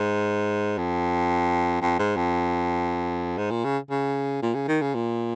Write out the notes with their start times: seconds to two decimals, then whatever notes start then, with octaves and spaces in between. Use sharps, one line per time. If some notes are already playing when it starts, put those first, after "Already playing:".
Already playing: G#2
0.78 F2
1.81 F2
1.99 G#2
2.16 F2
3.38 G#2
3.51 A#2
3.64 C#3
3.90 C#3
4.42 A#2
4.55 C#3
4.68 D#3
4.82 C#3
4.94 A#2